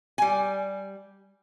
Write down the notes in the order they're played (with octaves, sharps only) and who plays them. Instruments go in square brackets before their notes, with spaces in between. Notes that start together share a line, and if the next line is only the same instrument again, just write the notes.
[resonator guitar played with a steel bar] G3 G#5